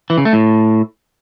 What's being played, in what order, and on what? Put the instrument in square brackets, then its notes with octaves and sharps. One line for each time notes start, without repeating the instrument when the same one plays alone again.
[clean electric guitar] E3
C#3
A3
A2